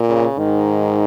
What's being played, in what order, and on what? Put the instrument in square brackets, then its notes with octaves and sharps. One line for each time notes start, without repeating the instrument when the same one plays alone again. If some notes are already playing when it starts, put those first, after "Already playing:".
Already playing: [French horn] A#2
[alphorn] C#3
[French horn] G#2 [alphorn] D#3